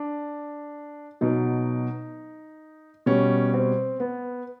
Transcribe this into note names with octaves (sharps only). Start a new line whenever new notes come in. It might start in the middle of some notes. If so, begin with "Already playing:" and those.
Already playing: D4
B2 F#3 D#4
B2 G3 C#4
C4
B3